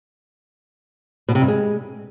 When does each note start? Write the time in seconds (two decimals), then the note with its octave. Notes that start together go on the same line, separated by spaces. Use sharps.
1.28 B2
1.35 C3
1.42 G2
1.48 G#3